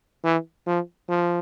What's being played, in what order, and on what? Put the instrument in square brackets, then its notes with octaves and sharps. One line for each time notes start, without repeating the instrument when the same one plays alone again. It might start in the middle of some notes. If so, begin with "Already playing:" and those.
[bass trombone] E3
F3
F3